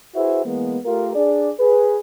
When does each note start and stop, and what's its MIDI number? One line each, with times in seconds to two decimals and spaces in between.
0.15 0.41 64
0.15 0.41 66
0.15 0.41 68
0.15 0.41 71
0.15 0.41 72
0.15 0.41 76
0.46 0.77 52
0.46 0.77 56
0.46 0.77 58
0.46 0.77 59
0.85 1.11 57
0.85 1.11 65
0.85 1.11 67
0.85 1.11 70
1.15 1.52 62
1.15 1.52 68
1.15 1.52 74
1.59 1.98 68
1.59 1.98 71